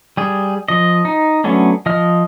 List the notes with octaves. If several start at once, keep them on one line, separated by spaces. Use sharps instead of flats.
G3 G#4
F3 D#5
D#4
F#3 A3 B3 C#4 D4
F3 D#5 F6